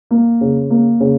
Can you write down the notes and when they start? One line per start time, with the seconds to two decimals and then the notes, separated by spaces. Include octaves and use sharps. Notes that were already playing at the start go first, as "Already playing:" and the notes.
0.11 A#3
0.41 C#3
0.70 A#3
1.00 C#3